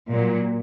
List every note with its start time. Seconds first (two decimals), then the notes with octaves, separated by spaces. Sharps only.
0.10 A#2 F#3